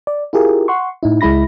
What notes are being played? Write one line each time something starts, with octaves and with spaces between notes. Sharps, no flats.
D5
E4 F4 G4 G#4 A#4
F#5 C6 C#6
A2 D#4 E4
C#2 G#3 E4 B5 A#6